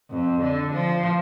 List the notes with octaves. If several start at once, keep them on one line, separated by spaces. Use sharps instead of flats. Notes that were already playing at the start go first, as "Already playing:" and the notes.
F2
D3
F3